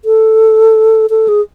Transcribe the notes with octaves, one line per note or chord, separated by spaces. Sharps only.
A4
A4
G#4